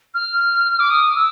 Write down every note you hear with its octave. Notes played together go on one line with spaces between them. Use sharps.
F6
D6
D#6
E6